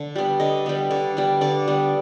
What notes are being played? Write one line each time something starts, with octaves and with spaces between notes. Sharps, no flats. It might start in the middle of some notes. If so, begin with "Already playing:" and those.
Already playing: D3
G3 B3
D3 D#5
G3 B3
D3
G3 B3
D3 D5
G3 B3